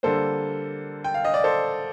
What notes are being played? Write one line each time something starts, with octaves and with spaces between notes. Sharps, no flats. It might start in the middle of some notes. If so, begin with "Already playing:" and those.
D3 G3 A#3 A4 C5
G5
F5
D#5
D5
A4 C5